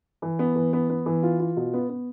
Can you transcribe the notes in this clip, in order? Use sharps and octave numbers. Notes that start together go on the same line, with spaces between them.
E3
B3
E3
B3
B3
E3
F4
F4
B2
B3
B3